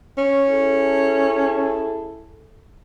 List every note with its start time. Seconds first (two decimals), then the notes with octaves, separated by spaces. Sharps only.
0.18 C#4
0.49 E4 G#4 A4